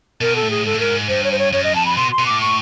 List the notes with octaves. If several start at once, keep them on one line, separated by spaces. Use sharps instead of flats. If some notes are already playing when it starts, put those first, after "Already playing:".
B2 A#4
A4
A2
G#4
G#2 A4
A2
G#2 A#4
G2 C5
C#5
C5
C#5
F#2 C#5
D#5
F2 A5
B5
B2 C6
C6
B2
A2 D6
C#6